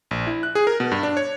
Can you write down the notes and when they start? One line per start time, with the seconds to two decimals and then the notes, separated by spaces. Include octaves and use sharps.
0.11 A#1
0.27 E4
0.43 F#6
0.55 G#4
0.67 A#4
0.80 B2
0.91 G2
1.03 D4
1.17 C#5